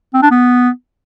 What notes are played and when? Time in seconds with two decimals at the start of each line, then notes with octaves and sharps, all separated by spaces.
0.14 C4
0.22 D4
0.31 B3